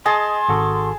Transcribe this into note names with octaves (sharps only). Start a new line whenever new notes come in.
G#4 D#5 A5 C6
G#1 F#4 A4